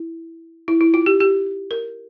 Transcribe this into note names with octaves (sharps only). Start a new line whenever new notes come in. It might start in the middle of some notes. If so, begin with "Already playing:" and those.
Already playing: E4
E4
E4
F4
G4
G4
A#4